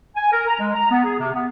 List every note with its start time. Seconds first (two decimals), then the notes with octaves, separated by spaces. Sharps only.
0.16 G#5
0.32 A#4
0.47 A#5
0.60 G#3
0.75 A#5
0.91 B3
1.04 G#4
1.19 C3
1.34 B3